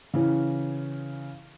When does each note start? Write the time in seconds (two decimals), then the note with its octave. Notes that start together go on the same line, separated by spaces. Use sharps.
0.14 C#3 E3 C#4